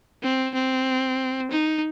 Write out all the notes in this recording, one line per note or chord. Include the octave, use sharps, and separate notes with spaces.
C4
C4
D#4